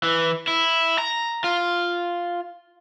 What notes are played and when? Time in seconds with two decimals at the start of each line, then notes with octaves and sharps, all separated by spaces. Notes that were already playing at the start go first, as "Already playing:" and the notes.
0.03 E3
0.48 E4
0.98 A#5
1.44 F4